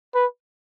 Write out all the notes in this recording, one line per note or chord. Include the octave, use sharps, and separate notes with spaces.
B4